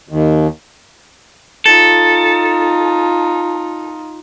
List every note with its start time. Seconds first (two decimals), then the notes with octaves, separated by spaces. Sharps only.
0.09 D#2
1.66 D#4 F4 A4